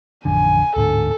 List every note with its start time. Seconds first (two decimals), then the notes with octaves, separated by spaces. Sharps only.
0.25 A1 F2 D3 G#5
0.76 D1 G#2 D3 A4